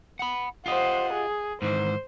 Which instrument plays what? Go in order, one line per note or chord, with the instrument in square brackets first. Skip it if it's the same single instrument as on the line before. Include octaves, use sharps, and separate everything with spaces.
[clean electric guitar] F#5 B5
[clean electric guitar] F4 G4 D#5 [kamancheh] C5 F#5
[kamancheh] G#4
[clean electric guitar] G#2 D#3 E3 [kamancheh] C5